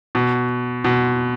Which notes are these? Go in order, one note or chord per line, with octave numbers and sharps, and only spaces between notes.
B2
B2